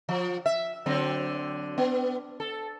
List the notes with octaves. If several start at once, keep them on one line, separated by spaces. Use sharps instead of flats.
F3
E5
D3 F#3 C4
B3
A4